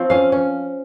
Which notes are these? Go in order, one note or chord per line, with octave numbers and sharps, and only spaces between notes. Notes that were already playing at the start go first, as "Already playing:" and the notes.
Already playing: F3 C4 C#5
C#4 F5
C#4